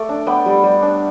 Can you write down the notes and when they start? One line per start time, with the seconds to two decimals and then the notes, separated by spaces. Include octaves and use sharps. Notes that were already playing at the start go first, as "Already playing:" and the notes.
Already playing: A3 D5
0.09 D4
0.27 B3 D5 G5
0.46 G3
0.64 G3
0.82 D4